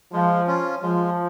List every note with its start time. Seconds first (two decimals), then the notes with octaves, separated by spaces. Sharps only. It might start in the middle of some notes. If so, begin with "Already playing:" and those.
0.13 F3 G#3
0.47 C#4 F4
0.82 F3 G#3